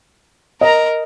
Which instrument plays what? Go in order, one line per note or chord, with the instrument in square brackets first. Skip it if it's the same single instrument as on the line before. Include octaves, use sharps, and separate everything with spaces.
[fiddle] A#4 A#5 [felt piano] D#5